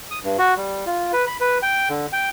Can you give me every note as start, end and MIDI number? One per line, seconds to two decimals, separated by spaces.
0.11 0.19 87
0.23 0.37 43
0.38 0.54 66
0.57 0.85 55
0.86 1.12 65
1.13 1.25 71
1.27 1.37 83
1.40 1.58 71
1.63 1.89 79
1.89 2.07 50
2.13 2.30 79